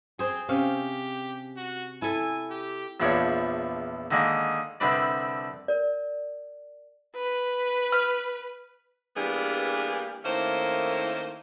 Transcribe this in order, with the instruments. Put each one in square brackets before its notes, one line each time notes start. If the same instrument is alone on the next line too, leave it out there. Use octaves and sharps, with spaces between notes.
[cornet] C4 [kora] G#4 C5
[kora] C3 C#4 F5 [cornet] G4
[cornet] F#4
[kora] E4 A4 [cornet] G#5
[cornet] G4
[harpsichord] A#1 E2 F3 D4 C#5 C6
D3 D#3 G#3 A#3
C2 D3 C4 D4 B4 D5
[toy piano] A#4 D5
[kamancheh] B4
[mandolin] F6
[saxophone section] E3 G3 A#3 B3 D4 G#4
D#3 A3 A#3 C#4 E4 C5